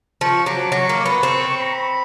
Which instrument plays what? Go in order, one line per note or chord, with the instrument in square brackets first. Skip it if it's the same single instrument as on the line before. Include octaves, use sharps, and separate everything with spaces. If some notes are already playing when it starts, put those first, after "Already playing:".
[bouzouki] F3 [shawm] C#6
[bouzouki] F#3 [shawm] D6
[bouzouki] F#3 [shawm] C#6
[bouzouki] A#3
B3
C4
[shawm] A#5
B5